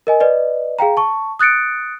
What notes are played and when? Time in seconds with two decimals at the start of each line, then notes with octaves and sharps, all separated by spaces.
0.07 A#4 D#5 G#5
0.20 B4 D5 D#5
0.79 G#4 F5 G5 A#5
0.97 A5 C#6
1.39 D#6 F#6 A6 C#7 D7